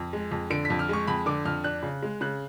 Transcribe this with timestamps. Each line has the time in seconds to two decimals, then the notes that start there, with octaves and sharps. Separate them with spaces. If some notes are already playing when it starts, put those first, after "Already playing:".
Already playing: F2
0.13 G#3
0.32 F2
0.50 D3 D7
0.65 B6
0.70 F2
0.79 F6
0.89 G#3 C#6
1.07 F2 B5
1.26 D3 D6
1.45 F2 F6
1.64 D4 F#6
1.83 C#3
2.02 G#3
2.21 C#3 F#6